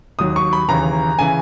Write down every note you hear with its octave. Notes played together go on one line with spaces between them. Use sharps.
D#2 D#3 F#3 D#6
C#6
B5
D#2 C#3 E3 A#5
C#3 E3 G#5